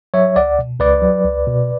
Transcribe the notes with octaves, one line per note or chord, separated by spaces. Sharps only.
F#3 C#5 E5
C#2 D5 F#5
B2
C#2 B4 D5
F#3
C#2
B2